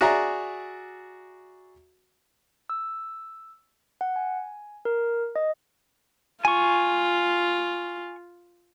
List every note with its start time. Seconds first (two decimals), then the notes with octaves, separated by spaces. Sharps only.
0.01 F#4 G#4 D5 E5 A#5
2.70 E6
4.01 F#5
4.16 G#5
4.85 A#4
5.36 D#5
6.45 F4 G#5 C#6